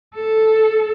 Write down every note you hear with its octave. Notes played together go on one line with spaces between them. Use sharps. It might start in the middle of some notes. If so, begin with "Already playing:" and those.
A4